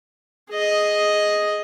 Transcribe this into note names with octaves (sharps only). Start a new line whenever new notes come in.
G#4 D#5